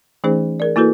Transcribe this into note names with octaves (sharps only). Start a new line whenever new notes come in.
E3 A3 C#4 D#4 G#4 C5
G#4 A#4 D5
A#3 E4 F#4 A4 B4